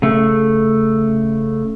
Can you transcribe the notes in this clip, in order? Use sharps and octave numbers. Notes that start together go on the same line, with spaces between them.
C#3 A3